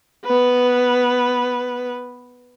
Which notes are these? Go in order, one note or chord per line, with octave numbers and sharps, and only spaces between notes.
B3 B4